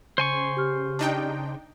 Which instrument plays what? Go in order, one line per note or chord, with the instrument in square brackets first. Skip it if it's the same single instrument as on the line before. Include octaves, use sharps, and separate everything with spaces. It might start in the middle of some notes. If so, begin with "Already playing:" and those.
[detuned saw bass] C#3 [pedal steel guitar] C5 G#5 C#6
[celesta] G4 F6
[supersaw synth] D4 D#4 G5